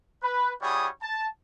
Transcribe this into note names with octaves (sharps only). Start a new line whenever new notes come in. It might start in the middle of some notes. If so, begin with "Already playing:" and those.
B4
G3 E4 F#4 G#4 C#5 D#6
A5